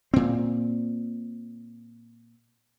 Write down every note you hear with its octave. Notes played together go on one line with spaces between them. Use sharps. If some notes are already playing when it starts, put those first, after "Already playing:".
A#2 C4